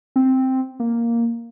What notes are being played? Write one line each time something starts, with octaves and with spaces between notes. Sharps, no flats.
C4
A#3